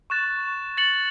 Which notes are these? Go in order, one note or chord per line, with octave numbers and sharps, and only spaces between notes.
C#6 F#6 A6 E7
A6 C#7 F#7